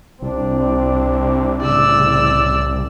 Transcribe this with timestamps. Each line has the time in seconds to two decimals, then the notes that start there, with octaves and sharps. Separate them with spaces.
0.22 C2 C4 D4
1.61 A2 C#3 D5 E6